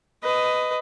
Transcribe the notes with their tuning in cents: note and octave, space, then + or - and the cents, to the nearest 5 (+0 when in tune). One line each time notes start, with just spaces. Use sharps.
B4 +20 D#5 +0